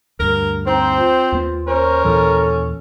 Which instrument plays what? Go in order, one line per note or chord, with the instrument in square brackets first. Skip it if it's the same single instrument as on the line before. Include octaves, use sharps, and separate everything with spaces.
[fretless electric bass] D2 G2 [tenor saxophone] A#4
[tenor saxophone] C4 [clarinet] D#4 [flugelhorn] C5
[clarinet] F4
[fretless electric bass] D#2 B3
[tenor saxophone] C#4 [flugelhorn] A#4 [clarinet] C5
[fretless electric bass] D#2 A#2 E3 [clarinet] A4